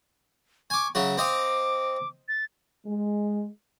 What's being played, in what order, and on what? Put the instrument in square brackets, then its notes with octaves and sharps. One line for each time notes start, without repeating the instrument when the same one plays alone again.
[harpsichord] G#5 D6 [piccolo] C#6
[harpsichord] C#3 F#3 F#4 [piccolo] E5
[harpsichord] C4 D#5 F5 [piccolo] D6
[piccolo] A6
[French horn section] G#3